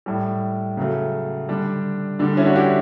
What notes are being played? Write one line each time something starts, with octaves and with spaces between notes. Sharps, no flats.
A2 G3
C#3 F#3 A3
D3 G3 D4
D3 G3 D4
C#4 E4
D4 F#4
E4 G4